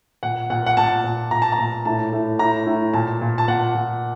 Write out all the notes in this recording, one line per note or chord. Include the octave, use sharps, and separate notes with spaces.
A#2 F#5
A#2 F#5
F#5
A#2 A5
A#2
A#2 A#5
A5
A#5
A#2
A2 A5
A2
A2 A#5
A2
A#2 A5
A#2
A5
A#2 F#5
A#2